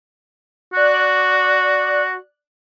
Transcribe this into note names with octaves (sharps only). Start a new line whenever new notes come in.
F#4 D5 F#6